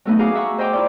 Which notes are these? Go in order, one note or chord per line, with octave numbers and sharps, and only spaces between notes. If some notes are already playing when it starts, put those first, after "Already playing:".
F#3 A3 B3 D#4
F#4 G#4 F5 F#5 A#5 D6
E5 F#5 C#6
C5 D#5 E5 G5 A#5 D6
E4 F4 D5